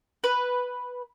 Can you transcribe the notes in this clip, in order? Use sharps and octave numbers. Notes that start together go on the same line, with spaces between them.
B4